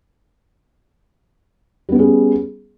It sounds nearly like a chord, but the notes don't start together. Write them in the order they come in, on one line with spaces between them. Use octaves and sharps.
G3 B3 C#4 G#4